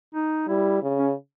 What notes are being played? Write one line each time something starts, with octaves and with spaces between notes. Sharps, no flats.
D#4
G3 E4
C#3
C#4